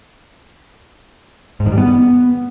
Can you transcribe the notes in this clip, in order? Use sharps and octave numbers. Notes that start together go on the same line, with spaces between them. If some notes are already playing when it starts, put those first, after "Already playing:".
G#2
D#3
G3
B3